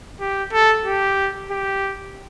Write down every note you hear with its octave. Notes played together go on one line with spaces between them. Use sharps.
G4
A4
G4
G4